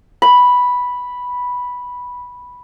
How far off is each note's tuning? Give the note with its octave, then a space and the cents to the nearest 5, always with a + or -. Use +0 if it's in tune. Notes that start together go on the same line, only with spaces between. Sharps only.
B5 -5